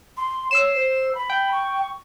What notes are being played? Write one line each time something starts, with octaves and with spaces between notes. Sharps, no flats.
C6
C#5 E6 C7 E7
C5
B5
G5
C#6